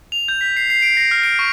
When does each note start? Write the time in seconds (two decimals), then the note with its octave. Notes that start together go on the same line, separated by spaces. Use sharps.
0.12 F7
0.28 G6
0.41 B6
0.57 C7
0.70 C7
0.82 D7
0.97 A#6
1.11 F6
1.23 D7
1.39 C#6